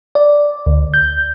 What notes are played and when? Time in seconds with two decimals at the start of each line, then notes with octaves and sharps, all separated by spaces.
0.15 D5
0.66 D2
0.94 G6